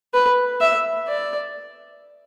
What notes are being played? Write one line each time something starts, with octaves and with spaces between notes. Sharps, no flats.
B4
E5
D5